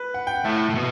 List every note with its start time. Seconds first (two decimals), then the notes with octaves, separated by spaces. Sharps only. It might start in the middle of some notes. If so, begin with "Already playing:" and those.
Already playing: B4
0.14 F#5
0.27 G5
0.35 F#5
0.45 A2 E5
0.70 A2
0.75 B2